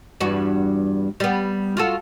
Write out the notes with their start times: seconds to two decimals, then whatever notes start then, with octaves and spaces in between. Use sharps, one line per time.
0.20 E2 G2 F#4
1.20 G3 B3
1.77 F4 F#4 A4